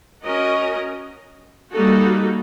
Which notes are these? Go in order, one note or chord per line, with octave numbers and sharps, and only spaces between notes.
C#4 F#4 A#4 D#5
G3 A#3 D#4 F#4 A4